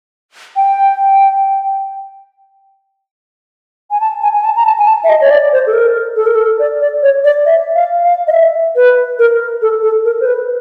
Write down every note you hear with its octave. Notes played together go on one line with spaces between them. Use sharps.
G5
G#5
A5
G#5
G#5
A5
A#5
A5
G#5
A5
E5
D#5
C#5
D5
C5
A4
A#4
A4
A#4
A4
D5
D5
C#5
D5
E5
F5
F5
D#5
E5
B4
A#4
A4
A4
A#4
C5
B4